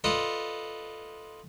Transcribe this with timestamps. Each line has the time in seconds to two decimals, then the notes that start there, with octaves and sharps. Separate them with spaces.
0.04 F4 A4 B4 D5 D#5